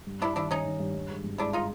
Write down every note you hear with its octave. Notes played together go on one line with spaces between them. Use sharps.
G2
G2 D4 E4
D#3 D4 E4
D#3 C#4 D#4
D#3
G2
G2
G#3
G#1
G#3 D4 E4
D#4 F4